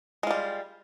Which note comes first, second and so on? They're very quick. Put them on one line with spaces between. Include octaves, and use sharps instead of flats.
G#3 F4 G3